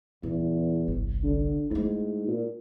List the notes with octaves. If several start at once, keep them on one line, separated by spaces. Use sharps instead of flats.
D#1 E2
G1 C2
D3
G#2 A3 E4
A#2